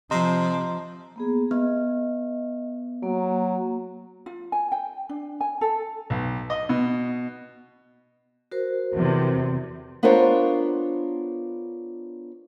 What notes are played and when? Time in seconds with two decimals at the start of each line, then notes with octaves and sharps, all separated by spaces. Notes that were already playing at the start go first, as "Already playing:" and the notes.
0.11 C3 F3 D#5 A#5 C6
1.16 A#3 B3 G#4
1.51 B3 D#5
3.03 F#3 A#3
4.26 F4
4.52 G#5
4.72 G5
5.09 D4
5.41 G#5
5.61 A4
6.10 B1
6.50 D#5
6.69 B2
8.52 F#4 A#4 C5
8.94 E2 C3
10.03 B3 D4 F4 A#4 C5 C#5